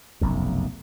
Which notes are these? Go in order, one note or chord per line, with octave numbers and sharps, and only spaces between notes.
F1 B1 F#2